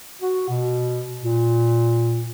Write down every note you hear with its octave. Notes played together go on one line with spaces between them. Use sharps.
F#4
B2
A#2